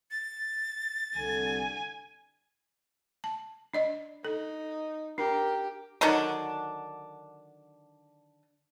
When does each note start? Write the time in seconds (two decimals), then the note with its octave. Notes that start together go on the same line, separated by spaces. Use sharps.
0.11 A6
1.17 C2 D3 G#5
3.24 A5
3.73 D4 D5 D#5
4.25 D#4 A4
5.18 D4 G4 A#4
6.01 D3 D#3 F#3 D4